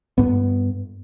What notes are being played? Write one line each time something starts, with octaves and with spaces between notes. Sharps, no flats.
G2 B3